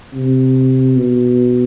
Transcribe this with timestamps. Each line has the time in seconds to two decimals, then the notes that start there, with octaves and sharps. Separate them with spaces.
0.14 C3
0.96 B2